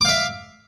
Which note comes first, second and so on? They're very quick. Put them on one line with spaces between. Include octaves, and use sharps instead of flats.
D6 F5 E5